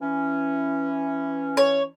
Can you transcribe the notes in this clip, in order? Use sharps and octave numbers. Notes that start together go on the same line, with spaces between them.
E3 C#4
C#5